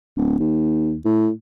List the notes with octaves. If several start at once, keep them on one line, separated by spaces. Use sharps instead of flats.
D1
D#2
A2